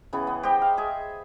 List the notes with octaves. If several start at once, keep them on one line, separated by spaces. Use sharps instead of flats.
C#3 E3 B3
B3
G4 C5 D#5 G5
F5
G#4 E5